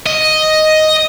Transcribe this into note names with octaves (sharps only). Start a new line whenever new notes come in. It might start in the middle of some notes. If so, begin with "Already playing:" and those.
D#5